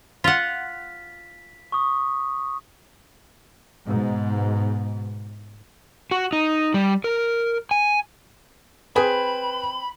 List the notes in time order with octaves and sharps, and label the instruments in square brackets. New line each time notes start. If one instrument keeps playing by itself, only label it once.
[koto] F4 F#5 [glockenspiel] B6
[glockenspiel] C#6 D#6
[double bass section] G#2 B2
[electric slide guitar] F#4
D#4
G3
A#4
G#5
[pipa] C4 G#4 G#5 [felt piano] B4 [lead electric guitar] B5